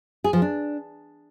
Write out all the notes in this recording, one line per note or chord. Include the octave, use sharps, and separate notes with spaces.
G#4
F3
D4